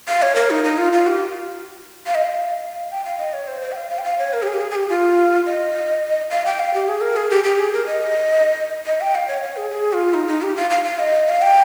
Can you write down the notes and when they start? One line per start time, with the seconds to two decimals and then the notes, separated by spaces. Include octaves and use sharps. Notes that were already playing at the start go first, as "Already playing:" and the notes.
0.08 F5
0.22 C#5
0.35 A#4
0.50 D#4
0.64 D#4
0.78 F4
0.93 F4
1.07 G4
2.06 F5
2.15 D#5
2.25 F5
2.91 G5
3.05 F5
3.19 D#5
3.33 C#5
3.48 C5
3.62 C5
3.72 G5
3.76 F5
3.90 F5
3.98 G5
4.04 F5
4.18 C#5
4.33 A#4
4.42 G4
4.47 G#4
4.54 G4
4.61 G#4
4.71 G#4
4.75 G4
4.89 F4
5.46 D#5
6.30 F5
6.46 G5
6.59 F5
6.74 G4
6.88 G#4
7.01 A#4
7.16 G#4
7.30 G4
7.44 G4
7.59 G#4
7.73 A#4
7.86 D#5
8.86 D#5
9.01 G5
9.15 F5
9.28 C#5
9.42 C#5
9.57 G#4
9.71 G#4
9.93 F4
10.14 D#4
10.27 D#4
10.42 G4
10.57 F5
10.70 F5
10.84 F5
10.99 D#5
11.29 F5
11.42 G5